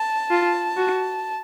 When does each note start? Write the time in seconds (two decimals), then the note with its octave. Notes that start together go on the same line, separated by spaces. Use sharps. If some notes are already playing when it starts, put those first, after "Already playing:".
Already playing: A5
0.31 F4
0.77 F#4